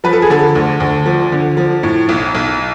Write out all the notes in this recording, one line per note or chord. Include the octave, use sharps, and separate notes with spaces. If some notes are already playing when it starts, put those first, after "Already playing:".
F3 B4
A4
G#4
D3 A4
D2
D2
F3
D3
F3
A2
B1
B1